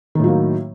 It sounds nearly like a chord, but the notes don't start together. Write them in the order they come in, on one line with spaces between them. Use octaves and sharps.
D#3 A2 F#3 A#3